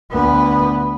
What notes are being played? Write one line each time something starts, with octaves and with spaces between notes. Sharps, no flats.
D2 B3